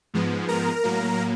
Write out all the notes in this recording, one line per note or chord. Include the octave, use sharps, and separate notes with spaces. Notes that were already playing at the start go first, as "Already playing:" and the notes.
G#2 F3 G#3 B3
A#4 A#5
A2 F#3 A#3